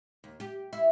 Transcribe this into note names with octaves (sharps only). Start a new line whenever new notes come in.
D#2
G4
E4